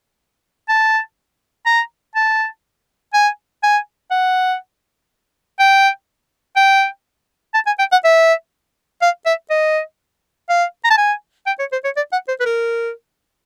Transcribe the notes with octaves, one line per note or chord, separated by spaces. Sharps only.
A5
A#5
A5
G#5
G#5
F#5
G5
G5
A5
G#5
G5
F#5
E5
F5
E5
D#5
F5
A#5
A5
G#5
G5
C#5
C5
C#5
D5
F#5
C5
B4
A#4